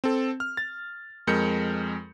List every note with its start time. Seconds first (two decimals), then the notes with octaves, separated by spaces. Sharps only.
0.04 C4 A4
0.40 F6
0.57 A6
1.27 F2 G#3 A#4 G6 C#7